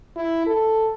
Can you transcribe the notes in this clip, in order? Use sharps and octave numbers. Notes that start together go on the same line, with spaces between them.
E4
A4